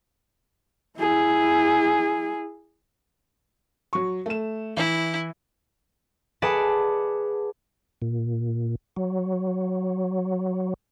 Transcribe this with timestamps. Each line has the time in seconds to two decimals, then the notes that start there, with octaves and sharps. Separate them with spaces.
0.98 E4 G#4
3.93 F#3 C#6
4.26 A3 E7
4.77 E3 E4
6.42 G#4 B4 D5 F#5 A5
8.02 A#2
8.96 F#3